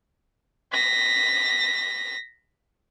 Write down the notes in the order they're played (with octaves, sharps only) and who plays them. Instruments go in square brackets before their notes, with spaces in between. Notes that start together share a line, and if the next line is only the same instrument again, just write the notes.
[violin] A#6 B6